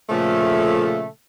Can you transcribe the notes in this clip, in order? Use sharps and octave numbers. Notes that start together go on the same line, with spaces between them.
A#2 C#3 F3 A3